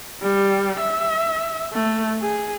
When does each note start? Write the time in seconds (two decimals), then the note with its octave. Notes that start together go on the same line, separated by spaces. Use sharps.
0.22 G3
0.80 E5
1.73 A3
2.22 G#4